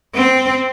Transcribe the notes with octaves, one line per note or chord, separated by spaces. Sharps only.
C4